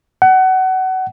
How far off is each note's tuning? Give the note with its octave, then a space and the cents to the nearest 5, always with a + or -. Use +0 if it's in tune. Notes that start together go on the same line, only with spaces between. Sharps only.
F#5 +25